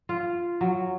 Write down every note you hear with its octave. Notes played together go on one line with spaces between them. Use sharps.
F4
F#3